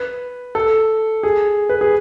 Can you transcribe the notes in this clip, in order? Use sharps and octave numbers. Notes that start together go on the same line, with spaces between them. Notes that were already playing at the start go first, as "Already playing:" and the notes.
Already playing: B4
A4
G#4
B4
G#4